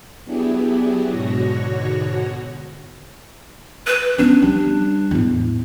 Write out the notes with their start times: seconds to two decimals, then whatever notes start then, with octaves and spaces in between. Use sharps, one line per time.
0.24 F#3 B3 D4 E4 G4 G#4
1.08 G#2 B2 D3 F#4 C#5 A#6
3.87 B4
4.18 B3 C#4 D4
4.42 G3
5.11 E2 A2